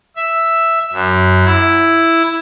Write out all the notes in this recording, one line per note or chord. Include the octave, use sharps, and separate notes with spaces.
E5
F#2
E4